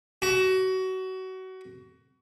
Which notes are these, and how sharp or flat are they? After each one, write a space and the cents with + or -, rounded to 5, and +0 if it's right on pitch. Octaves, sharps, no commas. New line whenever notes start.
F#4 +25